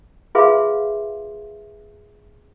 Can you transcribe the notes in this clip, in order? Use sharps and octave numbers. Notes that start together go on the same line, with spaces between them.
F4 G#4 B4 E5 F5 C6